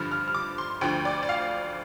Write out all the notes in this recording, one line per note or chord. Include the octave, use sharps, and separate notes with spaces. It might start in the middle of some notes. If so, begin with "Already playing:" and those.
Already playing: G2 D3 F3 F6
F6
F6
D6
C6
D2 D3 F3 G5
D5
D5
F5